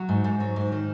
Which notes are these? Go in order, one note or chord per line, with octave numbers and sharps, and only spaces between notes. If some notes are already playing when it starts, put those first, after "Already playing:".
Already playing: F#3
G#2
G#2
F#3
G#2
D#3